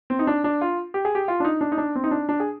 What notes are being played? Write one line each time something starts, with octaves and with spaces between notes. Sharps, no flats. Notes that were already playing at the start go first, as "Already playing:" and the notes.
C4
D#4
D4
D4
F4
G4
G#4
G4
F4
D4
D#4
D4
D#4
D4
C4
D#4
D4
D4
G#4